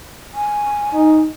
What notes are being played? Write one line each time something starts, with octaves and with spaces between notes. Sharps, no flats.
G#5
D#4